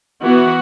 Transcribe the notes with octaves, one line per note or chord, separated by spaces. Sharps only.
E3 B3 F#4